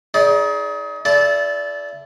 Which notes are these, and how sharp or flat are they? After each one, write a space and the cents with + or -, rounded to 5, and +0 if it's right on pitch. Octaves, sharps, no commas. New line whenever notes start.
D#4 +30 G#4 +10 D5 -25
E4 +30 A4 -25 D5 -15